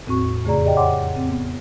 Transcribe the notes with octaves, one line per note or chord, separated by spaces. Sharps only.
E2 A2 C4 F#4 C#6
F2 C#3 A3 G#4 D5 A#5
G4 D5 D#5 G5
C#5 F#5 G5 C6 D6
C4
B3